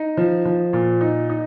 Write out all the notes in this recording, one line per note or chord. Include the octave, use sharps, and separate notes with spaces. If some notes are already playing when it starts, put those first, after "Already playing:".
Already playing: D#4
F3
F3
A#2
D#4
D#4